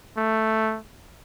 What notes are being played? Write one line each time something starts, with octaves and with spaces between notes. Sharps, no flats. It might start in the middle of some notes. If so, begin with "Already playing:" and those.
A3